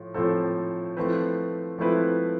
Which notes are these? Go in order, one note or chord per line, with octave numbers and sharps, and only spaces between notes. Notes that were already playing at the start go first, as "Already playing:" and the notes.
Already playing: A2 F3 F4
A2 F3 C4 F4 A4
F3 A3 C4 E4 B4
F3 A3 C4 E4 B4